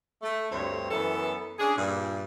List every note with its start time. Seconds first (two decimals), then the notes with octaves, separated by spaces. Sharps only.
0.22 A3
0.51 D2 G2 C4 C5 C#5
0.91 F#2 E3 B3 A4
1.59 C#4 D4 G#4
1.76 G2 A#2